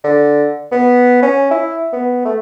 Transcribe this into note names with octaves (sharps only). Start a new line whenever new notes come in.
D3
B3
C#4
E4
B3
A3